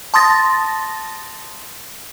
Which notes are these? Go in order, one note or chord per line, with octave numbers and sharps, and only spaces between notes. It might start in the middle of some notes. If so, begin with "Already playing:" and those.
A5 C6 D#6 A6 A#6